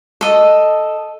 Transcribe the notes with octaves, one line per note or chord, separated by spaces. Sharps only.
A4 D#5